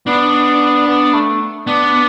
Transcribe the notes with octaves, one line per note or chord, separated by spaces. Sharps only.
B3 D4
B3
A3
B3 D4